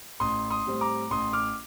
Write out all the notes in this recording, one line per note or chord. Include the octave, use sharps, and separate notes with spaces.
A1 C6 D#6
C6 D#6
A2 G3 C4
A#5 D6
A1 C6 D#6
D6 F6